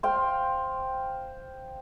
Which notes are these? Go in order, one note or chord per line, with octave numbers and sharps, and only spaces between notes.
C5 F5 G5